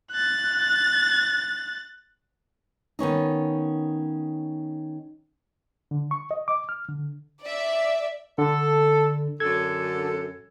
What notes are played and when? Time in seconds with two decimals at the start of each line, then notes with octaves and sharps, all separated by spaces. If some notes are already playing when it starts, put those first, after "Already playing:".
0.12 F#6 A6
2.99 D#3 B3 C#4 D#4
5.91 D3
6.11 C#6
6.31 D#5
6.48 D6
6.69 F6
6.89 D3
7.43 D5 E5
8.38 D3 A4
9.40 F#2 D3 A4 G#6